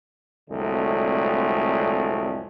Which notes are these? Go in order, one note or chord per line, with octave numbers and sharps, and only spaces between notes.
C2 F2 D3 F#3 G#3 A3